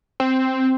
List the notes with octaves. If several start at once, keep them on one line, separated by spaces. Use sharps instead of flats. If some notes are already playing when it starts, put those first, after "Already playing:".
C4